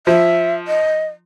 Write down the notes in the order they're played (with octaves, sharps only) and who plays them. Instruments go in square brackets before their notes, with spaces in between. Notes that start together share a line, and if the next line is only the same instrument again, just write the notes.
[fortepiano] F3 [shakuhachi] E5
[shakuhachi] D#5